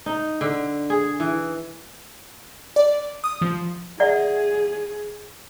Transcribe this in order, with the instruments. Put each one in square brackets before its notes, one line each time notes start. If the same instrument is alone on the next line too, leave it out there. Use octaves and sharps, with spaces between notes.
[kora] D#4
D3
G#4
E3
[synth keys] D5
D#6
F3
[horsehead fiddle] G#4 [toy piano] D5 E5 F#5